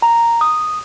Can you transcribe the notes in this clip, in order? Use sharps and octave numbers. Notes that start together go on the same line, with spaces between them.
A#5
D#6